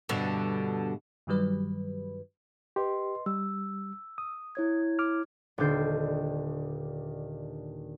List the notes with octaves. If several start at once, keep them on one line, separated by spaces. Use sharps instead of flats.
G2 B2 D3
G2 D#3 F#3 G3 B4
G4 B4 D#5 C6
G3 E6
D#6
E4 C#5 G#6
D6 F6
D#1 D#2 D3 D4 G6 C7